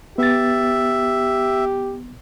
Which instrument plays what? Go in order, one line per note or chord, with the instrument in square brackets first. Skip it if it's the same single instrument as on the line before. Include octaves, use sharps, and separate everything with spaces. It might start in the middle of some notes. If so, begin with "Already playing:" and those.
[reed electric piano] B3 A6 [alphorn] G4 [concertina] E5